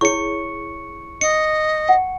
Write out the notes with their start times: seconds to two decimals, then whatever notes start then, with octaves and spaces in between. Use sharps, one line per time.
0.01 E4 G#4 C#5 C#6 C#7
1.21 D#5 C#7
1.89 F#5